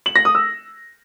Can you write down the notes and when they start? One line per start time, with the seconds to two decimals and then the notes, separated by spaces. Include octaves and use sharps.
0.06 F#7
0.16 A#6
0.25 D#6
0.35 E6